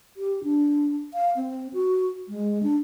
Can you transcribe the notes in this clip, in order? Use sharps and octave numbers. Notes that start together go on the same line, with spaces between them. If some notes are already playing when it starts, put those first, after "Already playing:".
G4
D4
F5
C4
F#4
G#3
D4